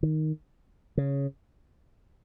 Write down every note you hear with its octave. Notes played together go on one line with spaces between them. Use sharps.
D#3
C#3